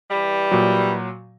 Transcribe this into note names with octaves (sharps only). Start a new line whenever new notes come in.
E3 G3
A#2 F#3